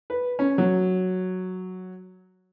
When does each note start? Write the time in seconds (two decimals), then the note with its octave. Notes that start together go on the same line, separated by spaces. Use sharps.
0.10 B4
0.39 C#4
0.58 F#3